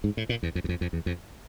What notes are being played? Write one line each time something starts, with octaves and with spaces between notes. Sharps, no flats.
G#2
A2
A#2
E2
F2
E2
F2
F2
E2
F2